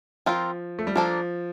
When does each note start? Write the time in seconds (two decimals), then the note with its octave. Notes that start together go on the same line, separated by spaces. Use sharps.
0.26 F3 C4 F4 A#4
0.79 A3
0.87 G3
0.96 F3 A#3 D4 A4